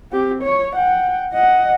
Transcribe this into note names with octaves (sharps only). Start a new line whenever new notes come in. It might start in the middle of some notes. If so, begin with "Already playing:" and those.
C4 G4
C#5
F#5 G5
D#5 F#5